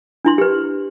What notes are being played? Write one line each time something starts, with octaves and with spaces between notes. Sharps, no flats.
D4 E4 C6
G4 B4